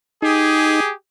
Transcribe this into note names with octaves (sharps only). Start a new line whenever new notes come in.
D#4 G4 G#4